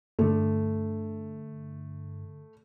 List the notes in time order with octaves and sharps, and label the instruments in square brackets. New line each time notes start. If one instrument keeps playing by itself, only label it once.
[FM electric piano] G2 D3 [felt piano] A3